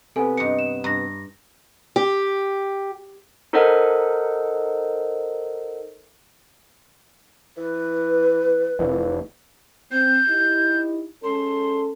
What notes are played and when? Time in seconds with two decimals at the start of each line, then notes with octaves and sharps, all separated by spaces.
0.16 C3 B3 A4 G#5
0.37 G2 D#4 C#7
0.59 E7
0.84 G2 A#5 A#6
1.96 G4
3.53 D#4 A4 A#4 C5 D#5 F#5
7.57 E3 B4
8.79 F1 E3
9.92 C4 G6
10.28 D#4 E4 G4
11.24 G#3 C#4 A4 C6